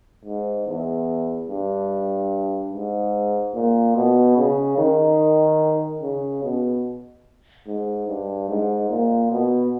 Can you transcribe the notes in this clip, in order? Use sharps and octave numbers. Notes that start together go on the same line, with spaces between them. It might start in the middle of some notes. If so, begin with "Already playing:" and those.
G#2
E2
G2
G#2
A#2
B2
C#3
D#3
C#3
B2
G#2
G2
G#2
A#2
B2